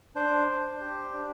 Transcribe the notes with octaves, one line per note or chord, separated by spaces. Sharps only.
D4 C5
D4
G4
D4